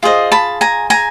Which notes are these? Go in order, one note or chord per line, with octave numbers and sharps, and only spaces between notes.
F4 G#4 C5 D#5
A5 B5
G#5 A#5
G#5 A#5